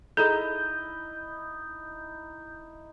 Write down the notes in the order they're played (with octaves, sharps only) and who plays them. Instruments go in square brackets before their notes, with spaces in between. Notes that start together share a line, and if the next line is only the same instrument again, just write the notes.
[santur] D#4 E4 D#5 [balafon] G#4 A4 [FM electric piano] G6